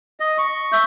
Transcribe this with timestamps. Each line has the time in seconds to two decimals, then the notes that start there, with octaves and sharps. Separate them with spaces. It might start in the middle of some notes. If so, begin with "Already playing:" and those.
0.20 D#5
0.38 C#6
0.72 E5 G6